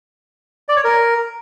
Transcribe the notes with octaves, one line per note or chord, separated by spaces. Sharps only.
D5
C#5
A#4